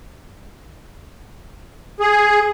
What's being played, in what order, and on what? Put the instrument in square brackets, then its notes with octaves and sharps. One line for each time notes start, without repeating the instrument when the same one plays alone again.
[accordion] G#4